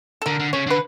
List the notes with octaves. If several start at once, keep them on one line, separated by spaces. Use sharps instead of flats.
A4
D3 A#4
D3
C#3 C#5
D3 B4